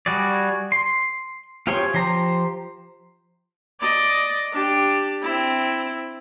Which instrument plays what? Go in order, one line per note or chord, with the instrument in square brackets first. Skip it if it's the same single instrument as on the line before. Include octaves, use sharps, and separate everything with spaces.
[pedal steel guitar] G3 F#4 G#4 D5
C6
F4 G4 G#4 C5 C#5
F3 G4 C5 A#5
[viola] D5 D#5
D4 G4
C4 E4